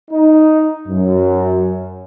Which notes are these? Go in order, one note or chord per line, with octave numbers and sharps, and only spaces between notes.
D#4
F#2